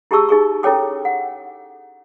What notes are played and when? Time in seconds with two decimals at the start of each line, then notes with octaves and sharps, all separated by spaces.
0.11 E4 G4 G#4 A5 C#6 E6
0.29 D#4 G#4 C#6
0.63 C#4 E4 A4 C#5 G5 D6
1.05 F#5